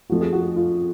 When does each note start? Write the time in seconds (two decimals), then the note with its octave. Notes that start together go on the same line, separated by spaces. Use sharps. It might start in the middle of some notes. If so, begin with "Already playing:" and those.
0.10 F2 F3 A3 F#4
0.21 G#4
0.33 F#4
0.56 F4